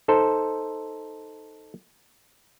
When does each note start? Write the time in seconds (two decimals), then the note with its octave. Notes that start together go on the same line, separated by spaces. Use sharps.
0.08 D#4 A4 C5